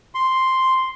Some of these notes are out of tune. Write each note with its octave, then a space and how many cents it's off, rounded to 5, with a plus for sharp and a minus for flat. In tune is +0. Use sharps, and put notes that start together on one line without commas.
C6 +0